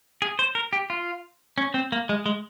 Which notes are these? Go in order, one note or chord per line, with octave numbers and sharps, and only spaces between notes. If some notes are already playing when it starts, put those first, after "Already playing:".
G#4
C5
A#4
G4
F4
C#4
C4
A#3
G#3
G#3